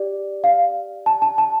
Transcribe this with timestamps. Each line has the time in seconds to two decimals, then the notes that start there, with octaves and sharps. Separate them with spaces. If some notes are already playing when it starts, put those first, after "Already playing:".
Already playing: G4 D5
0.44 F5
1.06 A5
1.22 A5
1.38 A5